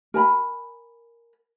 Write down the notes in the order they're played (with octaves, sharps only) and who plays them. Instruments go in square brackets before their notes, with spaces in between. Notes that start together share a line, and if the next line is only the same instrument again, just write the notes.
[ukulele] A#4 G#5 A#5 B5